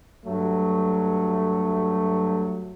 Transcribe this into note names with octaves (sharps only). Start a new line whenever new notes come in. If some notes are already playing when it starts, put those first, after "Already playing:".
G2 F#3 A3